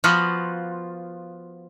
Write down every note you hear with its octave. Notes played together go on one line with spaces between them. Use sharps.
F3 B3 F4 F#4